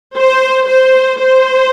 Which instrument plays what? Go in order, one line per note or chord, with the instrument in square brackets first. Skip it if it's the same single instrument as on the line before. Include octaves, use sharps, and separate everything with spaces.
[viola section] C5
C5
C5